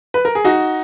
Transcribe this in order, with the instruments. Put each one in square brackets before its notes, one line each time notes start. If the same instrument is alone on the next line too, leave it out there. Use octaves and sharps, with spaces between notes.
[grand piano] B4
A#4
G#4
D#4 F#4